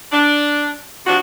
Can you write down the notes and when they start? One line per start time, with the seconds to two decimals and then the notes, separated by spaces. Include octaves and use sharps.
0.13 D4
1.06 C3 F3 D4 F#4